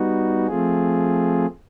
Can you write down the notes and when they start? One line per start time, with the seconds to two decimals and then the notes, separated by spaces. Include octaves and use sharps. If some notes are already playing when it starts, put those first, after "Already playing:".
Already playing: G3 B3 D#4 F#4
0.47 F3 A3 C4 F4 G#4